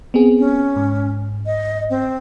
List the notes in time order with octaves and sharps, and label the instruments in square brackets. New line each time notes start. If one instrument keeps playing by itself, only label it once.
[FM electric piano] B3 C4 G#4
[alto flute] C#4
[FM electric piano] G#2
[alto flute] D#5
C4